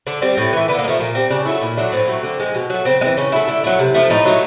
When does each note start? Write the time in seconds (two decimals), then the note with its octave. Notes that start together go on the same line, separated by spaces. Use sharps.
0.07 D3 D4
0.22 G3 C4
0.37 A2
0.53 E3 A3
0.68 D3 B3
0.79 A#3
0.84 G#3
0.88 F3 A3
1.00 A#2 A#3
1.15 G3 C4
1.30 C#3 D4
1.45 F#3 A3 E4
1.62 A#2 E4
1.77 F#3 A3 D4
1.92 A2 C4
2.08 F#3 A3
2.23 D3
2.40 F3 G#3
2.54 B2
2.70 F#3 A3
2.85 C#3 C4
3.01 E3 G#3 C4
3.17 C#3 C#4
3.32 F#3 A3 E4
3.48 D3
3.64 F#3 A3
3.79 C3
3.94 F3 A3
4.10 A2 D#4
4.25 F#3 A3